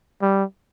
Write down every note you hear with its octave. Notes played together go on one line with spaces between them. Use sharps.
G3